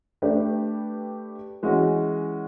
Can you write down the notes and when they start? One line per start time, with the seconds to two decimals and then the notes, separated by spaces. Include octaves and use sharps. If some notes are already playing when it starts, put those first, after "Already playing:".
0.22 A3 D4 G4 B4 D5
1.63 E3 G#3 C#4 F#4